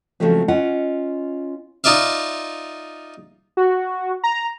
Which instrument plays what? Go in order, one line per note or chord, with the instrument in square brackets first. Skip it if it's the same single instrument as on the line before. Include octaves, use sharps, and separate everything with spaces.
[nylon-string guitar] C#3 F3 F#3 G#3 A3 C4
C#4 F4 D#5 F#5
[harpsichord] D#4 F4 D5 E5 F5
[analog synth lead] F#4
A#5